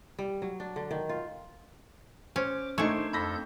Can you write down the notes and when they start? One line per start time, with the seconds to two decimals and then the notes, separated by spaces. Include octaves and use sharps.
0.19 G3
0.42 F#3
0.60 D4
0.76 D3
0.91 D#3
1.09 F4
2.36 C#4 C5 D6
2.78 A3 D4 D#4 C5 G#5 C#6 G#6 E7
3.13 F2 A4 B5 G6 A#6 B6